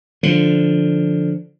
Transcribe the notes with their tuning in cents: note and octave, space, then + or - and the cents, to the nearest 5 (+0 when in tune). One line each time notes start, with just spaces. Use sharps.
D3 +0 F3 +0